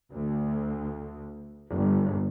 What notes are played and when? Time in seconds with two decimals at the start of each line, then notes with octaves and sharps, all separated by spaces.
0.11 D2
1.72 G1